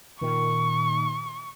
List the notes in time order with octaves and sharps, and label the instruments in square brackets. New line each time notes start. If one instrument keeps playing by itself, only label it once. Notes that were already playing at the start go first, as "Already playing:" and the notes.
[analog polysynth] A#2 D#3 [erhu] C#6